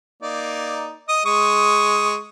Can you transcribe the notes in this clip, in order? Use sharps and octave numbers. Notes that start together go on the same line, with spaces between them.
A#3 D#4 D5
D#5 D#6
G#3 C#6 D#6